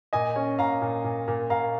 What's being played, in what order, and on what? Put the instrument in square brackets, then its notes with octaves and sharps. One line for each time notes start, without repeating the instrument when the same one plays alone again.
[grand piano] A#2 D#5 G#5
C#4
A#2 F5 A#5
A#2
A#2
A#2
A#2 F5 A#5